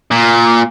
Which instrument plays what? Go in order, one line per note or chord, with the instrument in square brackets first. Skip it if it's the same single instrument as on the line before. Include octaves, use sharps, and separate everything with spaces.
[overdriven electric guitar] A#2